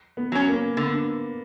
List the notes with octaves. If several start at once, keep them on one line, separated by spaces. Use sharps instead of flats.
B3
F#3 C#4
A#3
D3 B3